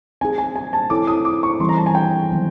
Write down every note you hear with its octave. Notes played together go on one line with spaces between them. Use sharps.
C4 D#4 G#4 G#5
G#5
G#5
A5
C4 E4 A4 C#5 D6
D#6
D6
C#6
E3 G3 C4 C6
A#5
A5
G#5
G5
D#3 F#3 B3